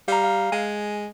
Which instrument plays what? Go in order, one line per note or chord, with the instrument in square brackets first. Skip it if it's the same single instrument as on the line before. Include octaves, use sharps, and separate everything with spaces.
[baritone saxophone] G3 [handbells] F5 A#5
[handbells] F5
[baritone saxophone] G#3 [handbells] G#5